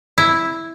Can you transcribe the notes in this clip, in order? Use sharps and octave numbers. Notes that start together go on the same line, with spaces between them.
E4